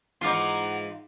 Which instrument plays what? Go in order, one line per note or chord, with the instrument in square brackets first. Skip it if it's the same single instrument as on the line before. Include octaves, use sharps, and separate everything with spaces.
[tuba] G#2 [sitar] E3 D#4 [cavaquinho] F4 F5 D6 [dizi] F#5